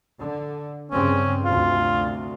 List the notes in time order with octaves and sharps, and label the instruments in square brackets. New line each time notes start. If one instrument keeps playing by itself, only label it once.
[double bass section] D3
[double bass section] G2 C#3 C4 [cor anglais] C#4
[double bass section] D2 C3 [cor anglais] F4